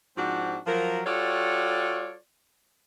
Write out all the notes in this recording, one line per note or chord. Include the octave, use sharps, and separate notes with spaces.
G#2 F3 C4 D4 F#4
F3 F#3 A#4
G3 F4 F#4 A4 C#5 D5